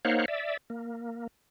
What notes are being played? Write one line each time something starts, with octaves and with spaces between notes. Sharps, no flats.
A#3 D#4 C5 C#5 F5 F#5
D5 E5
A#3